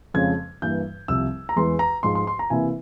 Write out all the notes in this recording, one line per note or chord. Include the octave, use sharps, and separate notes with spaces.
F2 C#3 F3 G#3 C#4 G#6
G2 E3 A#3 G6
C2 C3 F3 E6
A#5
E2 E3 G#3 C6
A#5
G#2 F3 G#3 C6
C6
C6
A#5
C3 E3 A#3 E4 G#5